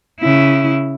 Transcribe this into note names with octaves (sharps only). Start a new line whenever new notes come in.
C#3 E4